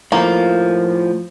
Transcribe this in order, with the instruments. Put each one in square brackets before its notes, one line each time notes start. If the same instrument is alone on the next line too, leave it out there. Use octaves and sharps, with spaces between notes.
[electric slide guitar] A2 F3 [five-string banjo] A#3